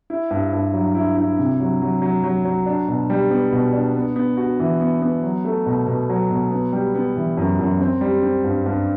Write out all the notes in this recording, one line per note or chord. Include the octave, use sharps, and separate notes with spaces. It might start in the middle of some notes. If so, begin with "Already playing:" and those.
E4
G2
G2
F#3
E4
E4
C3
F#3
F#3
F#3
F#3
F#3
D4
B2
G3
B3
B2
D4
B3
B3
F#4
E3
B3
B3
F#3
A3
B2
B2
F#3
B2
B3
G3
B3
E3
F#2
F#2
C4
G3
C4
G2
G2